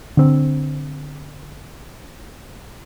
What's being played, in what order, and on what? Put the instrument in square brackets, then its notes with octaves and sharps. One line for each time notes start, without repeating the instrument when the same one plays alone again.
[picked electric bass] D3 C4